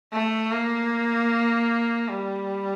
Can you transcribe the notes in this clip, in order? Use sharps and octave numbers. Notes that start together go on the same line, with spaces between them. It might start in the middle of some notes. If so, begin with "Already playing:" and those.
A3
A#3
G3